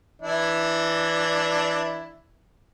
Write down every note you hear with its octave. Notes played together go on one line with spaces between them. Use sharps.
E3 D4 E4